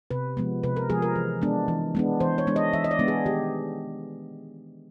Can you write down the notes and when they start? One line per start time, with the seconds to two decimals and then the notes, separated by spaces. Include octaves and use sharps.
0.11 C3 B4
0.37 F3 G#3 B3
0.63 C3 B4
0.77 A#4
0.90 F3 G#3 B3 G#4
1.02 A#4
1.16 E3
1.42 G#3 B3 D4
1.68 E3
1.95 G#3 B3 D4
2.20 E3 C5
2.38 C#5
2.47 G#3 B3 D4
2.56 D#5
2.73 E3 E5
2.84 D#5
2.91 D5
2.99 G#3 B3 D4
3.08 G#4
3.26 D#3 G4